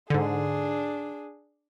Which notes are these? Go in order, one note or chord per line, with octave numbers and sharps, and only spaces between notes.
G#2 D3 D4 G#4